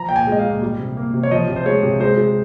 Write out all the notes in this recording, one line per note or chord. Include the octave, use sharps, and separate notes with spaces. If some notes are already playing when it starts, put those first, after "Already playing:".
Already playing: F3 A#5
A#2 G5
G#5
G#3 D#5
F5
A#2
G3
C3
A#3
C3
C#5
F3 D#5
C3
C5
G#3 C#5
C3
G#3 C5
G#3